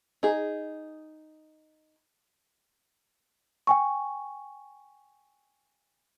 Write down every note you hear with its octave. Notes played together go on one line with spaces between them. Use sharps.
D#4 G#4
G5 G#5 C#6